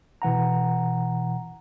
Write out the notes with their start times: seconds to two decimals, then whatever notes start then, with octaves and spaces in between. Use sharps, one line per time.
0.22 B2 E3 F#5 A#5